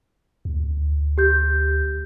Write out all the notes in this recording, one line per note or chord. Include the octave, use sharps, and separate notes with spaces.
D2
G4 G6